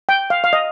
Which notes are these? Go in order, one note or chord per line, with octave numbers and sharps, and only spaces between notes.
G5
F5
F5
D#5